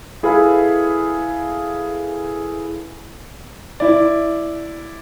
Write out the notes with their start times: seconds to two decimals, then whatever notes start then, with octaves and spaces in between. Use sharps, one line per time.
0.23 E4 G#4 A4 B4 F5 B5
3.80 E4 D5